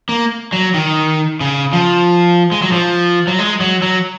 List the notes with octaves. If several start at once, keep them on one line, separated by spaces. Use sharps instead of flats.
A#3
F#3
D#3
C#3
F3
G#3
F#3
F3
F#3
G#3
F#3
F#3